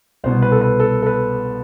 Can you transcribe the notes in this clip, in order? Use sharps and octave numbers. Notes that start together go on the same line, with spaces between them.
C2 B2 B3 C5
B4
A4
B4
A4
A4
B4